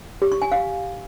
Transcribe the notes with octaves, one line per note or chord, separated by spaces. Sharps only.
G4
C#6
G#5
F5